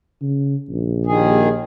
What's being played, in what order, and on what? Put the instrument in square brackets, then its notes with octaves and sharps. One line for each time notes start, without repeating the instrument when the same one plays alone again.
[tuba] C#3
A#1
[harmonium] D#2 D#3 G#4